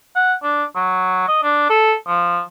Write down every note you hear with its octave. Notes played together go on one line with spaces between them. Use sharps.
F#5
D4
F#3
D#5
D4
A4
F3